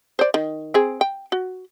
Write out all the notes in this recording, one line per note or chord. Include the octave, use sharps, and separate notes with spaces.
C5 D5
D#3
C4 G#4
G5
F#4